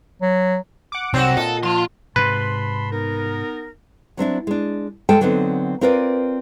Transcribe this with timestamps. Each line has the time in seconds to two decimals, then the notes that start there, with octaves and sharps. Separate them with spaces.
0.22 F#3
0.92 F#5 D6
1.14 C2 F#3 C4 F#4
1.37 A#2 A4 D#5
1.63 F3 F5 C6
2.16 G#2 C3 B4 A5 B5 C6
2.92 B3 D#4 A#4
4.17 F#3 C4 D4 E4
4.47 G#3 D4
5.09 G#3 A4 G5 A5
5.21 D3 F#3 B3 C4 D#4
5.81 C4 F4 A#4 B4 C#5 D5